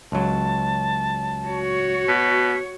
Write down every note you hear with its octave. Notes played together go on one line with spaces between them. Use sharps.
C#2 F#3 A5
F#4 C#5
B2 B6